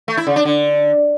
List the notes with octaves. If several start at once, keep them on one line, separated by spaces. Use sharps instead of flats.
A3
E4
C#3
D4
D3